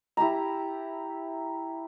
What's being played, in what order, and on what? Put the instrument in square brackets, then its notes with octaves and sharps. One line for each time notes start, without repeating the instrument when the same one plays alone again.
[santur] E4 G4 A5 A#5